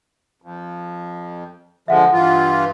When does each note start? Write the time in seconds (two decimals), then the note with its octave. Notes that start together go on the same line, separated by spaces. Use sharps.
0.42 F2
1.88 D3 F3 G#3 E5 F#5
2.13 G2 E3 F4